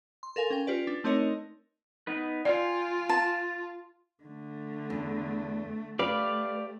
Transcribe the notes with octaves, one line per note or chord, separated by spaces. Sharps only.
C6
A4 A#4 F5 G#5
C#4 A#4 G5
F4 G4 B4 D5
D4
A3 C4 D#4 A#4 C#5 D#5
B3 D#4 B4
F4 D5 F5 G5 G#5
A5
D3 A3
E2
A3 G4 B4 D5 F5